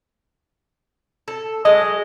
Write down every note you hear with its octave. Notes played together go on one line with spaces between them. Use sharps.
A4
F#3 G#3 D#5